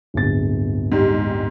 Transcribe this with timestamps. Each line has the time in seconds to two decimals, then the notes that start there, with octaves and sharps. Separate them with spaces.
0.14 D1 G1 A6
0.92 G#2 G3